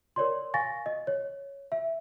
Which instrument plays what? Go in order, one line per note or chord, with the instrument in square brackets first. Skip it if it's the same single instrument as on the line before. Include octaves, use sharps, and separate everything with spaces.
[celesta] A#4 C#5 D5 C6
F5 G#5 C#6 A6 A#6
D#5
C#5
E5